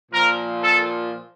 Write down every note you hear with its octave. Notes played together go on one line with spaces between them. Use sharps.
A#2 F3 A#4
A4